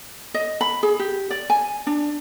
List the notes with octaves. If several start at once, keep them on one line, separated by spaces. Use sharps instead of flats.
D#5
B5
G#4
G4
D5
G#5
D4